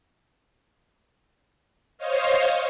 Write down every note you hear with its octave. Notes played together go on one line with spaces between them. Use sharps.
C5 C#5 D#5 F5